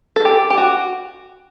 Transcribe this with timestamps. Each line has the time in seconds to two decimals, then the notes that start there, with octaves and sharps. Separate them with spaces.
0.16 A4
0.25 G4
0.50 G4
0.57 F#4